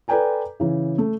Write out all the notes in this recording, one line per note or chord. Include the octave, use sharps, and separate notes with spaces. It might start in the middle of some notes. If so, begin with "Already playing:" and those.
A4 B4 D5 G5 G#5 A#5
C#3 E3
A3